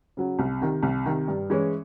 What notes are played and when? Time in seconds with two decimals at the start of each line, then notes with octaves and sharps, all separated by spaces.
0.17 C#3 F#3
0.39 C2
0.61 C3 D#3
0.83 C2
1.06 C3 D#3
1.28 G2
1.50 E3 G#3 C#4